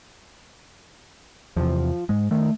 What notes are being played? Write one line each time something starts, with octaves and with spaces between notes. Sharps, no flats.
E2 C3 F3
G#2 G#3
D#3 A3